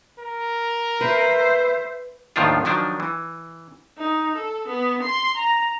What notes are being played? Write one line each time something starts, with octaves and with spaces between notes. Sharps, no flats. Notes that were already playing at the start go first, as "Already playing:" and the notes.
A#4
B4 C5 E5
D#2 A2 D#3 F3 D4 F4
D#3 F3 F#3 D4
E3
D#4
A4
B3
C6
A#5